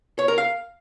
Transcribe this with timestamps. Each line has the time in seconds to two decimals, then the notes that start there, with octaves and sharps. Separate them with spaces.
0.19 C#5
0.28 A#4
0.38 F5